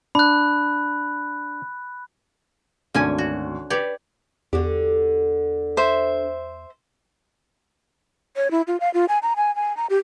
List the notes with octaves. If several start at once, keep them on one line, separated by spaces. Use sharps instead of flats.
D4 B5 F#6
G#1 D2 D3 C#4 G#5
F#4
G4 B4 C#5 D5
E2 D3 F#4 G4
C5 E5
C#5
E4
F4
F5
F4
G#5
A#5
G#5
G#5
A#5
G4